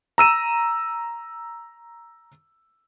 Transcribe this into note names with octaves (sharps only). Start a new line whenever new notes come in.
A#5 E6 D#7 E7